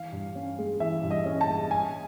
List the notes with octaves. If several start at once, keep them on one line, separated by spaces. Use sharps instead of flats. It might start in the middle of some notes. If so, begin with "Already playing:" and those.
Already playing: E3 F5
G2
C#4
G#3
E3 E5
G2
D#5
C#4
A5
G#3
G3 G#5